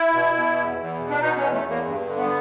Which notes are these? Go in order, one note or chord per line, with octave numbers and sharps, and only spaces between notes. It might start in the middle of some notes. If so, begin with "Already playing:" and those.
Already playing: E4
B2
B2
E2
E2
B2
D4
B2 D#4
C#4
E2
A3
E2
A#3
G2
D3
B3